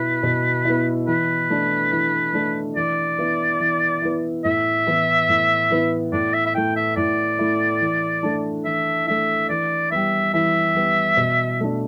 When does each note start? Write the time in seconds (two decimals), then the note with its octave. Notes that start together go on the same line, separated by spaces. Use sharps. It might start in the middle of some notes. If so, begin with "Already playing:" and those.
Already playing: B2 B3 E4 B4
0.23 B2
0.65 B3 E4
1.07 E3 B4
1.50 A3 D4
1.92 E3
2.34 A3 D4
2.76 E3 D5
3.19 B3 E4
3.60 E3
4.02 B3 E4
4.45 A2 E5
4.87 E3 B3 E4
5.29 A2
5.70 E3 B3 E4
6.12 A2 D5
6.34 E5
6.46 E5
6.55 A3 E4 G5
6.76 E5
6.97 A2 D5
7.39 A3 E4
7.81 E3
8.23 A3 D4
8.65 E3 E5
9.07 A3 D4 E5
9.49 E3 D5
9.91 G3 B3 E5
10.34 E3 E5
10.75 G3 B3
11.17 B2
11.60 A3 D4